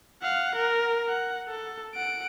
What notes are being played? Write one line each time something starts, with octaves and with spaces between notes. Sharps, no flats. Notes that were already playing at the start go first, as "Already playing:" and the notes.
F5 F#5
A#4
F#5
A4
F#5 D7